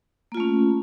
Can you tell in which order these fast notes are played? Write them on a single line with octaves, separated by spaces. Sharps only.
A#3 F4 A3 C#4